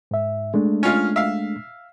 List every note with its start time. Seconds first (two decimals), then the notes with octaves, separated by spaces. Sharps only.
0.11 G#2 E5
0.54 G#3 A3 D4
0.83 C#4 F4
1.16 E5 F5